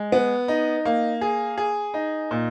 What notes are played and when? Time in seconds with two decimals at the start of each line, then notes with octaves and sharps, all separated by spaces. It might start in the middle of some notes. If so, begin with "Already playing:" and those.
Already playing: G#3
0.12 B3
0.48 D#4
0.85 A#3
1.21 G#4
1.58 G#4
1.94 D#4
2.31 A#2